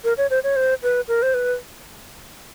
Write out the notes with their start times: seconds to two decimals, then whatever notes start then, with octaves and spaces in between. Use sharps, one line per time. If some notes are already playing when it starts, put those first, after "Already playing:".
0.04 A#4
0.18 C#5
0.30 C5
0.44 C#5
0.56 C5
0.83 B4
1.08 A#4
1.22 C5
1.34 B4